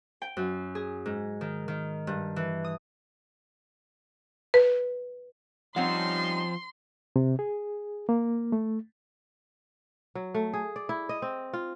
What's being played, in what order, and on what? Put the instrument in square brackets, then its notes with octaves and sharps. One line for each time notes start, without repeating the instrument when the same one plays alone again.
[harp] G5
F#2
G#4
G#2
D#3
D#3
G2
E3
D#6
[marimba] B4
[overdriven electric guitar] F3 [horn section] G3 C#4 D#4 [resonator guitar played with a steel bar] C4 C#5 F#5 [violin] C6
[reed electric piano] C3
G#4
A#3
A3
[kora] F#3
A3
G#4
D5
E4
D#5
C4
F4